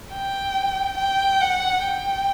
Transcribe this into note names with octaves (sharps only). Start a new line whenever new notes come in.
G5
G5
F#5
G5